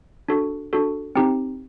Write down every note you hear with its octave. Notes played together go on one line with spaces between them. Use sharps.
D4 F#4 A4
D4 F#4 A4
C4 D#4 G4